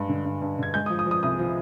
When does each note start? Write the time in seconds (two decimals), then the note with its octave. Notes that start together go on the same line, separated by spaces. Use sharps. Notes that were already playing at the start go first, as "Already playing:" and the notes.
Already playing: G2 G#3
0.09 D3
0.25 G2
0.42 G2
0.58 D3 G#6
0.74 G#3 G6
0.86 D#6
0.90 F3
0.99 D#6
1.06 F3
1.11 D#6
1.23 C2 D#6
1.39 F3